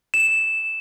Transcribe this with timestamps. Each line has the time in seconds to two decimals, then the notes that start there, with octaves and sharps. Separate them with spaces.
0.14 E7